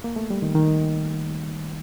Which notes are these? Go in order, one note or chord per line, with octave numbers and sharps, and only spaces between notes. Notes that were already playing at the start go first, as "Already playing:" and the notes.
A#3
A3
G3
D#3
D#3